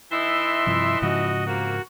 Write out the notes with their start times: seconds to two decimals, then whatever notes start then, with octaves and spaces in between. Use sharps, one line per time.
0.11 E3 D#4 E4 E5 C6
0.67 G2 C3 F3
1.02 G#2 C#3 F3 F#4 D#5
1.46 C3 A#3 F#4